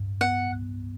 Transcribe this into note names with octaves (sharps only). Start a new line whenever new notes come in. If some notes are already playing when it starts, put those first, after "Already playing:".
Already playing: G2
B3 F#5